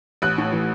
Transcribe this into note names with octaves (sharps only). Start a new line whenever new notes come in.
A1 F#6
A2
E3